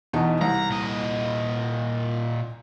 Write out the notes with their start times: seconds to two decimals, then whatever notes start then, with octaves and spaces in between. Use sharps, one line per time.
0.13 E2 B2 D#4
0.41 C2 A#5
0.70 A#2 D#5